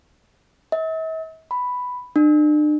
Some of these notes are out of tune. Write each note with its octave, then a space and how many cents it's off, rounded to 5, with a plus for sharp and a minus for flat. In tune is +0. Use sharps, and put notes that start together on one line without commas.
E5 -45
B5 +5
D4 +40